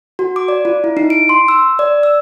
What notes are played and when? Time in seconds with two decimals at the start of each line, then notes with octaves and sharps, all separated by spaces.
0.19 F#4
0.36 D6
0.48 D5
0.65 F4
0.84 E4
0.97 D#4
1.10 D7
1.29 C6
1.48 E6
1.79 D5
2.03 E6